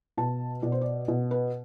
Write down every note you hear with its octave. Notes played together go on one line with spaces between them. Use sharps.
B2 A5
B2 D5
C5
D5
B2
B4